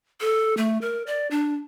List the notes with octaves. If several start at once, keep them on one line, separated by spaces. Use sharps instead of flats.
A4
A3
A#4
D5
D4